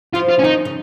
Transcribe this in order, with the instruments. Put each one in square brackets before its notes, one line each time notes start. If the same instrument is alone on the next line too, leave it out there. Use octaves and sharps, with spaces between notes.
[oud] F3 [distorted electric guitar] F4
[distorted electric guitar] F4
C#4
[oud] D#3 [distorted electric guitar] D#4
[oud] C#3